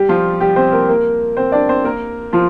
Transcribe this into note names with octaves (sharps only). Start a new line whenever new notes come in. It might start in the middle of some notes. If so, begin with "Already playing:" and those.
Already playing: G3 G4
F3 F4
G3 G4
C4 C5
A#3 A#4
A#3 A#4
C4 C5
D4 D5
C4 C5
A#3 A#4
F3 F4